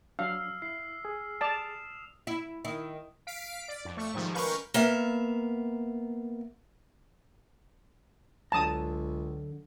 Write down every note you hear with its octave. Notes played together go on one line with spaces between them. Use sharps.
F#3 D4 F5 E6 F6 C7
E4 C7
G#4
D5 A5 D#6 E7 F7
E4
D#3 E4
F5 B6 D7
D5
F2
A3 C#6
G#2 D#3 F3 G3
C#4 A#4 B4 F5 C#6 G6
A#3 B3 E5 F5
C#2 D3 F#3 A5 A#5 D#6